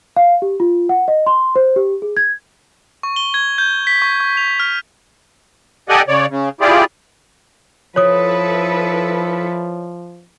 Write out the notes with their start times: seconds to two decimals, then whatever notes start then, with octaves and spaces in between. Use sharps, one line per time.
0.16 F5
0.42 G4
0.60 F4
0.89 F#5
1.08 D#5
1.26 C6
1.56 C5
1.76 G4
2.02 G#4
2.17 G#6
3.03 C#6
3.16 G7
3.34 G#6
3.58 G6
3.87 B6
4.02 C#6
4.20 C#6
4.37 F7
4.60 F6
5.89 G4 A4 D5 D#5 F#5 G#5
6.08 C#3 C#5 D5
6.30 C#3
6.61 E4 F4 G4 G#4 D5
7.96 F3 E4 A4 B4 C#5 D#6